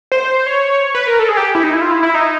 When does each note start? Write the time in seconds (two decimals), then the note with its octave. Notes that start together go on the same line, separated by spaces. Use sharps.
0.12 C5
0.46 C#5
0.95 B4
1.07 A#4
1.19 A4
1.29 G#4
1.37 G4
1.55 E4
1.63 D#4
1.73 E4
1.81 F4
1.91 E4
2.03 E4
2.14 D#4